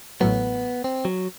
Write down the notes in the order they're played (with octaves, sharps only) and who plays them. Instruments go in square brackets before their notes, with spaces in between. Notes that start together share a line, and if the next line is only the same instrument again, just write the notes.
[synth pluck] A1 A2 F#3 [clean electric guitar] B3
[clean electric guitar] C4
F#3